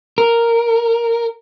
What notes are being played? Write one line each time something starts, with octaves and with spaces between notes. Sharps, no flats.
A#4